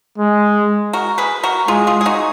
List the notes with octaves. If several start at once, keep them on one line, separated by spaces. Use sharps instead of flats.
G#3
F#4 A#4
G#4 B4
F#4 A#4
G#3 F4 G#4
F4 G#4
G#4
D#4 F#4